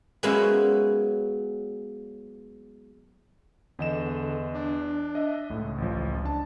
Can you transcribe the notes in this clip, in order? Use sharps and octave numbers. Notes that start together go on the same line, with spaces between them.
F#3 G#3 A#3 B3 C#4 E4
E2 D3 D#5 E7
D4
D#5 E5
C#2 A2
A1 F3
D4 A5